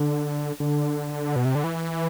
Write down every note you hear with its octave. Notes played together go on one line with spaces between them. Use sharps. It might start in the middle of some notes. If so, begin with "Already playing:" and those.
Already playing: D3
D3
B2
C3
D3
E3